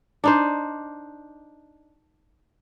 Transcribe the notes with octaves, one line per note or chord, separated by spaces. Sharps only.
D4 D#4 C5